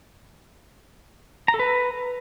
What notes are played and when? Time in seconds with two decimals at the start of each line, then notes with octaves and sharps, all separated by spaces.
1.48 A#5
1.54 A4
1.59 B4